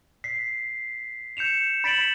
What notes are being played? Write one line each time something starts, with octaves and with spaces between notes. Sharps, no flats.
B6 C7
G6 C#7 E7 F7
B5 A6 B6 D7 E7 F#7